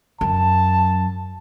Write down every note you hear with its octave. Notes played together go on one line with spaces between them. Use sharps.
F#2 A5